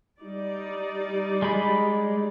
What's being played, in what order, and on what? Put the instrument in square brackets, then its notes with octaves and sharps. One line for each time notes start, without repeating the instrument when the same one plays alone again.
[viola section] G3 D#4 D5
[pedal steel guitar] G#3 B5